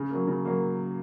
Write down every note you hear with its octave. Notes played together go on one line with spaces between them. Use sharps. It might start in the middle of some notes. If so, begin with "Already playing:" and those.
Already playing: C#3
F#3 A#3
C#3
F#3 A#3